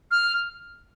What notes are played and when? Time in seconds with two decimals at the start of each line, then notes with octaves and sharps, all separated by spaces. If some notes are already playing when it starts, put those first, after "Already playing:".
0.11 F6